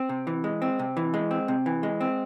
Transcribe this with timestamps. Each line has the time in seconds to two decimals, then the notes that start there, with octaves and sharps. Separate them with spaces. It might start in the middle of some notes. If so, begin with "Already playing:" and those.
Already playing: C4
0.09 C3
0.27 E3
0.44 G#3
0.62 C4
0.79 C3
0.97 E3
1.14 G#3
1.31 C4
1.48 C3
1.66 E3
1.83 G#3
2.01 C4